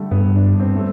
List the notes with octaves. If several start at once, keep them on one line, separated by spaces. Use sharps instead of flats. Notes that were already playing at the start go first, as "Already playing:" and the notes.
Already playing: D3 G3 A3
G2 B3
D4
C4
A3